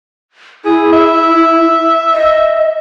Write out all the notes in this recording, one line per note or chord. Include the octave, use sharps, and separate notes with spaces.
E4 G#4
E5
D#5